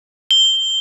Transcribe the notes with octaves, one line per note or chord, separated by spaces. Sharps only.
G7